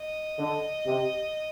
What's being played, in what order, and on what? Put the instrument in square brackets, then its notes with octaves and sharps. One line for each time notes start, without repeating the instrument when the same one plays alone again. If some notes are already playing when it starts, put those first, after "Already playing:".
Already playing: [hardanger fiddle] D#5
[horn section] D3
C3